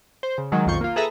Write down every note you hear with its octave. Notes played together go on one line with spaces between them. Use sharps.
C5
C#3
D#3 F#3 G#3
B1 F2 D#3 F4 C#6 G6
A#3 F4
G#4 A4 B4 E5 A#5